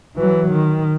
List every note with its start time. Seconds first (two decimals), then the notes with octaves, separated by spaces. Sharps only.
0.16 E3 F#3
0.51 D#3